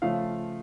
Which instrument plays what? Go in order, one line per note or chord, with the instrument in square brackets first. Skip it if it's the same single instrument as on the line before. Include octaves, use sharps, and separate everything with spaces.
[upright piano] C#3 F3 A3 F5